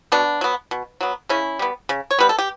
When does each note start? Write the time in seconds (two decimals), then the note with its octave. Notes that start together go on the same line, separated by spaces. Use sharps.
0.12 B2 B3 D4
0.41 F#3 B3
0.71 B2
1.01 F#3 B3
1.29 C#3 C#4 E4
1.59 G3 B3
1.89 C#3
2.11 C#5
2.19 G3 B3 B4
2.29 A4
2.39 G4